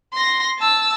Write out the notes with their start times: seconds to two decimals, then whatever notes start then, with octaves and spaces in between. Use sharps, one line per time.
0.14 C6 A#6
0.59 A5 E6